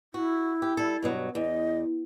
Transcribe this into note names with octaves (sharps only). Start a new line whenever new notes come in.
E4 F#4
G4
G3 A4
G2 B2 F#3
E2 D#5